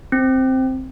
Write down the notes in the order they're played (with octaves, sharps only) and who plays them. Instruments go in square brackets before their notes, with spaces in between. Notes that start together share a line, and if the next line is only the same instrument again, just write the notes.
[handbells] C4